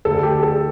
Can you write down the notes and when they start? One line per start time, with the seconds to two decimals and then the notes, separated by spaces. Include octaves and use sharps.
0.05 D2 D3 A3 A4
0.23 G4
0.43 A4